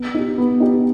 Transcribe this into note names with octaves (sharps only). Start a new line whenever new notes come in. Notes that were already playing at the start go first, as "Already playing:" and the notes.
Already playing: B3
D#4 G4
B3
D#4 G4